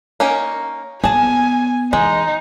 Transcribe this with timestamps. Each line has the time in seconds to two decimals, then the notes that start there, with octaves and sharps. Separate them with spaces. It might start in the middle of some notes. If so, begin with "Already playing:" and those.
0.20 A#3 C#4 D#4
1.04 B3 G#4 G#5 A5
1.93 E3 G#3 D#4